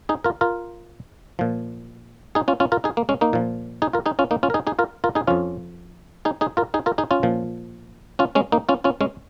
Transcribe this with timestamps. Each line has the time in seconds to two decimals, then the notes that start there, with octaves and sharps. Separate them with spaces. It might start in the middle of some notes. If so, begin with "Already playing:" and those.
0.09 D#4 G#4
0.24 F4 A#4
0.41 F4 A#4
1.39 A#2 F3
2.35 D#4 G#4
2.48 C#4 F4
2.60 C#4 F4
2.72 F4 A#4
2.84 D#4 G#4
2.97 A#3
3.09 G#3 C#4
3.21 A#3 D#4
3.33 A#2 F3
3.82 D#4 G#4
3.93 F4 A#4
4.06 D#4 G#4
4.19 C#4 F4
4.31 A#3 D#4
4.43 C#4 F4
4.50 A#4
4.54 D#4 G#4
4.67 D#4 G#4
4.79 F4 A#4
5.04 F4 A#4
5.15 D#4 G#4
5.27 F2 F3 C#4 F4
6.25 D#4 G#4
6.41 D#4 G#4
6.57 F4 A#4
6.74 D#4 G#4
6.86 F4 A#4
6.98 D#4 G#4
7.11 C#4 F4
7.23 A#2 F3
8.19 C#4 F4
8.35 G#3 C#4
8.52 A#3 D#4
8.69 C#4 F4
8.84 C#4 F4
9.01 G#3 C#4